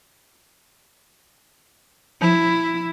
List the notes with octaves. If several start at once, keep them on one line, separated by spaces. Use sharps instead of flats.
F3 E4